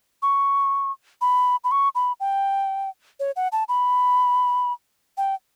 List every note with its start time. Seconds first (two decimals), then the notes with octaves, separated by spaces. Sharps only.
0.22 C#6
1.21 B5
1.64 B5
1.71 C#6
1.95 B5
2.20 G5
3.20 C#5
3.36 F#5
3.52 A5
3.69 B5
5.17 G5